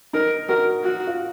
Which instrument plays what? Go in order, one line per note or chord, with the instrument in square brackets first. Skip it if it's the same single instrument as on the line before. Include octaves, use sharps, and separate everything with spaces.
[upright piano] D#4 [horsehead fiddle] A#4
[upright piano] F#4 [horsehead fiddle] A#4
[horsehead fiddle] F#4
[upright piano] F4